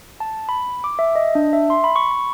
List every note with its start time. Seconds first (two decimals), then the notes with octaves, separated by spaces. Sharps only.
0.20 A5
0.49 B5
0.84 D6
0.99 E5
1.15 D#5
1.35 D4
1.53 E5
1.70 C6
1.84 B5
1.96 C#6
2.11 B5